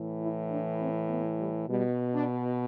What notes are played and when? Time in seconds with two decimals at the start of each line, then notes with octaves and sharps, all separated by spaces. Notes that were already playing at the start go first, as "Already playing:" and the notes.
Already playing: A2 E3
0.21 E4
0.50 D4
0.80 C4
1.09 B3
1.39 G3
1.68 B2 G3
2.12 D4